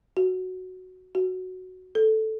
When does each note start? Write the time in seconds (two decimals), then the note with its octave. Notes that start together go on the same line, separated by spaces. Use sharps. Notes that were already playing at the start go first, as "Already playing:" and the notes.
0.17 F#4
1.15 F#4
1.95 A4